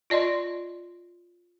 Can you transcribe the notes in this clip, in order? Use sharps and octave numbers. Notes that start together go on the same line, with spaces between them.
F4 D5 D#5 C6